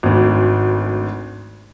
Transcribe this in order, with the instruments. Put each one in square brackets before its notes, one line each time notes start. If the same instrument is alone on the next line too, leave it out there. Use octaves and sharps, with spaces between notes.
[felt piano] G#1 D2